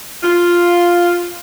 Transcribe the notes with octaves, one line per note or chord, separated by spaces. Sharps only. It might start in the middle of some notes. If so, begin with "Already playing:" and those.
F4